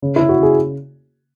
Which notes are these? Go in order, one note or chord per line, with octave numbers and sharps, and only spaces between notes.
C#3
C#3 E4
F#4
C#3 G#4